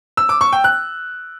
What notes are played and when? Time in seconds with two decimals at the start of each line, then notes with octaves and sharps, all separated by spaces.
0.17 E6
0.29 D6
0.41 C#6
0.53 G5
0.64 F#6